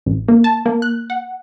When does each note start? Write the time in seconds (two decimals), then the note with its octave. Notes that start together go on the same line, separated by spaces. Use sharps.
0.06 A1
0.28 A#3
0.44 A5
0.66 A#3
0.82 F#6
1.10 F#5